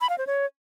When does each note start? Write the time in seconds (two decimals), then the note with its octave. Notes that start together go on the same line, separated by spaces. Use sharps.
0.01 B5
0.10 F5
0.18 C5
0.27 C#5